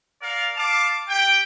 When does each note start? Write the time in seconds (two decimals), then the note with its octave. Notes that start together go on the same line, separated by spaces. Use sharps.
0.22 A#4 D5 F5
0.57 F5 A5 D6
1.09 G4 G5